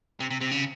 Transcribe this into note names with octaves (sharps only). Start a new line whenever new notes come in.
C3
C3
C3
C#3